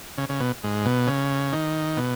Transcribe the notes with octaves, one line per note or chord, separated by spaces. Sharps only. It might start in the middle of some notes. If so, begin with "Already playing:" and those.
C#3
C#3
B2
G#2
B2
C#3
D#3
B2